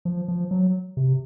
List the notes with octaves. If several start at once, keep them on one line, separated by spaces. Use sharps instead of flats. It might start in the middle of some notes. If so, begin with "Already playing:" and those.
F3
F3
F#3
C3